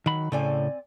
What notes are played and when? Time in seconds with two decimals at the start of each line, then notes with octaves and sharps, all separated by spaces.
0.06 D#3 F#3 B5
0.32 A2 C#3 A3 C4 D5 G#5